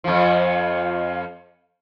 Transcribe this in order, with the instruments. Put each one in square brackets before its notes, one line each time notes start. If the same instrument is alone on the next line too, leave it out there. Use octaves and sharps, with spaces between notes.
[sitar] F2 F3